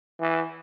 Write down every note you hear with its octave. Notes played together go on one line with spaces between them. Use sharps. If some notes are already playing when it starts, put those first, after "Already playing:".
E3